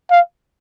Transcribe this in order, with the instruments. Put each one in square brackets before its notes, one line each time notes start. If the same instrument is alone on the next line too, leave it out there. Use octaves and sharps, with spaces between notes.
[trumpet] F5